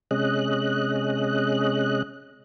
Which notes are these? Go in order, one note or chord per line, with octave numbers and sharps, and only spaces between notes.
C3 G#3 C#4 D#5 F#6